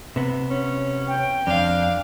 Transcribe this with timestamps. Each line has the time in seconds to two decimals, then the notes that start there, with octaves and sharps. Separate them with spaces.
0.16 C3 B3
0.50 C#4
1.08 G5
1.47 F2 D4 F5